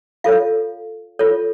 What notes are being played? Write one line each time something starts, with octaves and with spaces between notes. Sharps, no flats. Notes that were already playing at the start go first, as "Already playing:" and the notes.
F4 A4 C#5 F5
F4 A4 C#5